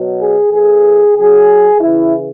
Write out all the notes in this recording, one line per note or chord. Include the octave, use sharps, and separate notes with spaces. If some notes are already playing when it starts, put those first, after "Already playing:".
Already playing: B2 F#3
G#4
A2 E3 G#4
C#3 F#3 G#4
C#3 E3 E4